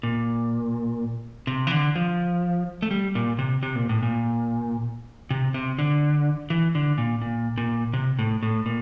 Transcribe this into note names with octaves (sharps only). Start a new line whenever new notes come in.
A#2
C3
E3
D3
F3
A3
G3
A#2
C3
C3
A#2
A2
A#2
C3
C3
D3
E3
D3
A#2
A#2
A#2
C3
A2
A2
A#2